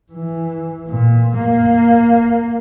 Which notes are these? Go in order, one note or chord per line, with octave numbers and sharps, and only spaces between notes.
E3
A#2
A#3